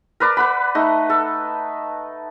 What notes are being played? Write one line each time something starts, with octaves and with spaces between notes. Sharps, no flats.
A#4 B4 D5
B4 F#5 B5
A3 D#4
A4